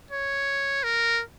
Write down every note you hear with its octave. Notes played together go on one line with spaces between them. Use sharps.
C#5
A#4